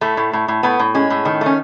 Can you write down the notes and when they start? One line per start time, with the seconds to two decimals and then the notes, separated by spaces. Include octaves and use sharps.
0.01 A2 A3
0.17 A2
0.33 A2
0.48 A2
0.63 A2 B3
0.80 A2
0.94 G#3 C#4
1.10 A2
1.25 D#3
1.41 A3
1.46 C#4